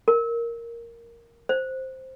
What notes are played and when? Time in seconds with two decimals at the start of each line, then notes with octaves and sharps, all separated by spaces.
0.08 A#4
1.49 C5